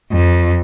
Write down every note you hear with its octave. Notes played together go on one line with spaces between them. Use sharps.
F2